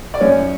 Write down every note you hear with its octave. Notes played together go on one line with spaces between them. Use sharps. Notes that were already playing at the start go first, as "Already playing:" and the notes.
D5
F#2 C#4 C#5